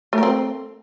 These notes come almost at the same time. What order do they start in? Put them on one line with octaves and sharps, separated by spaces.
A3 A#4 C4